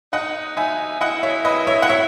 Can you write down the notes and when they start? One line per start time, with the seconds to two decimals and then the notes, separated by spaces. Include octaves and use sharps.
0.13 D#4 D#5 F#5
0.56 D#4 E5 G#5
1.01 E4 D#5 F#5
1.23 C#5 E5
1.45 B4 D#5
1.67 C#5 E5
1.82 F#5
1.89 C#5 E5